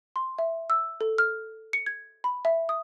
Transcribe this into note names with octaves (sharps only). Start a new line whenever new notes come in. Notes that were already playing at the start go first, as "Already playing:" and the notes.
C6
E5
E6
A4
F6
C#7
G#6
B5
E5
D#6